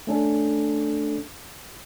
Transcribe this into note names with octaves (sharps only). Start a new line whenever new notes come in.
A3 C#4 D4 A4